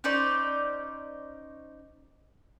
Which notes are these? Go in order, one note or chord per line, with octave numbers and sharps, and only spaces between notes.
C#4 D#4 C5 D5